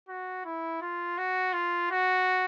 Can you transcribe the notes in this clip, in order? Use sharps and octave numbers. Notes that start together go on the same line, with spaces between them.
F#4
E4
F4
F#4
F4
F#4